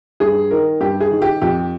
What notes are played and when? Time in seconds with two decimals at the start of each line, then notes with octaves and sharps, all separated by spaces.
0.20 G2 G#4
0.51 D#3 A#4
0.81 G2 G4
1.00 G#4
1.11 D#3
1.22 G4
1.42 F2 G4